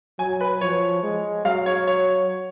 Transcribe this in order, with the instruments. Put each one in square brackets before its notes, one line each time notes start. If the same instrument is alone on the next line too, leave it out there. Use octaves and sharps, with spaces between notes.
[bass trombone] F#3 [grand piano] G#5
[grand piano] B4
[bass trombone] F3 [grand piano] C#5
[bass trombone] G#3
[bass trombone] F#3 [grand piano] F5
[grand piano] C#5
C#5